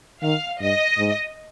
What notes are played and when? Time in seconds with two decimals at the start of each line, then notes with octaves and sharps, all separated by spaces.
0.22 D#3 F5
0.60 G2 D#5
0.99 G#2